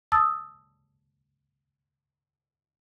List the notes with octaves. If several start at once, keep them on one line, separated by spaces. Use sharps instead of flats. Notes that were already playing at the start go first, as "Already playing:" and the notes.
A5 D#6 E6 A6